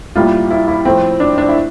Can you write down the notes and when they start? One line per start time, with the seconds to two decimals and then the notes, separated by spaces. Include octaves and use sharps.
0.15 A2 G3 A#3 F4
0.51 E4
0.68 E4
0.85 A2 F3 A3 C4
1.20 D4
1.38 D4
1.49 E4